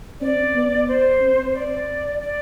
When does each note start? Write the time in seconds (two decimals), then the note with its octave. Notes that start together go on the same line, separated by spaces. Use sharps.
0.21 C4 D5
0.55 B3
0.88 C5
1.21 C4
1.54 D5
2.21 D5